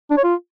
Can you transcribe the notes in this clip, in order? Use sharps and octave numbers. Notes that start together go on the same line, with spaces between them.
D4
C#5
F4